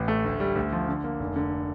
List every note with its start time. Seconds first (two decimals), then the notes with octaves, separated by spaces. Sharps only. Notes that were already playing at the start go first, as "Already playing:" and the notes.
Already playing: A1
0.08 A3
0.24 D2
0.40 G3
0.56 D2
0.72 F3
0.88 D3
1.04 A#3
1.20 F1
1.36 D3